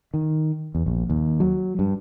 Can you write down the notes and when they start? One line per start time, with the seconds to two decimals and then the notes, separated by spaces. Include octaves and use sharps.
0.14 D#3
0.75 E2
0.86 A#1
1.10 D#2
1.40 F#3
1.79 G2